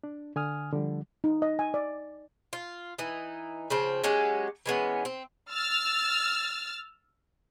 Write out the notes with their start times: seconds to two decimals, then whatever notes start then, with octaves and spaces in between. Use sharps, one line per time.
0.04 D4
0.36 D3 G#5 D#6 F6
0.72 D3 F3 G3
1.24 D#4
1.42 D#5
1.59 G#5
1.74 D5
2.53 F4
2.98 E3 D#4
3.70 C#3 F3 C4
4.04 F#3 G#3 C#4 G4
4.66 E3 G#3 B3 C#4
5.05 C4
5.51 E6 F6 A6